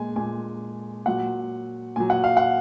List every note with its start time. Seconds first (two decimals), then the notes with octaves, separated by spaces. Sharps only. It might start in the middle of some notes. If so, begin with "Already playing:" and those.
Already playing: A#2 G#3 G#5
0.16 A#2 G#3 G#5
1.06 A#2 F#3 F#5
1.96 A#2 F#3 G#5
2.10 F#5
2.24 F5
2.37 F#5